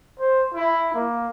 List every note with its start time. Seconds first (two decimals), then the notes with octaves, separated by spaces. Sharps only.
0.20 C5
0.54 E4
0.94 A#3